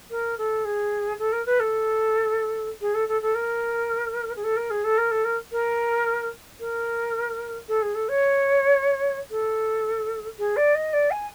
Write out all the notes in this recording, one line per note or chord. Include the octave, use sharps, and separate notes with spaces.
A#4
A4
G#4
A4
A#4
B4
A4
G#4
A4
A4
A4
A#4
G#4
A4
A#4
G#4
A4
A#4
A4
A#4
A#4
A#4
A4
G#4
A4
C#5
A4
G#4
D5
D#5
D5
G#5